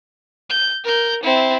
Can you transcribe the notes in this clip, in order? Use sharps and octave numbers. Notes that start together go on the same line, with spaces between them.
G6
A#4 G6
C4 E4